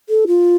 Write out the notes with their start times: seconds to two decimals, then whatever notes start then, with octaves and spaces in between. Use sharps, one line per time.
0.09 A4
0.27 F4